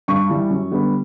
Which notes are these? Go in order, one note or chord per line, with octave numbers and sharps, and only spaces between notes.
G2 C#6
E3 G3
F#2
D3 G3 B3